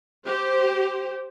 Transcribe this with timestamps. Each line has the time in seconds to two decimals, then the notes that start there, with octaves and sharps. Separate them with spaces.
0.25 G4 C5